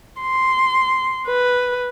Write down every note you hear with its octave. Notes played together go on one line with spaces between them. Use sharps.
C6
B4